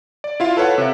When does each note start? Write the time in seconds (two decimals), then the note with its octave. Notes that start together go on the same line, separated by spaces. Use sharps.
0.24 D5
0.40 E4 F4 F5
0.57 A4 B4 C#5 F5 F#5
0.78 C3 E5